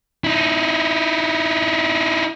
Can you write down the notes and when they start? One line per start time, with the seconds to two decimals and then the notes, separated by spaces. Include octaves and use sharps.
0.24 D#4 E4